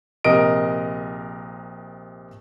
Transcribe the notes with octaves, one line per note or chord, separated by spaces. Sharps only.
A#1 C3 A#4 D#5 D7